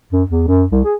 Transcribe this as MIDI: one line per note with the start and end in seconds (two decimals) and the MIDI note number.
0.12 0.23 42
0.28 0.47 40
0.48 0.64 42
0.72 0.80 36
0.84 0.95 68